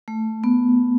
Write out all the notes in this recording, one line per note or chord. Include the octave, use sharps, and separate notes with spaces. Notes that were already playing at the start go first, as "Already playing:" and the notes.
A3
B3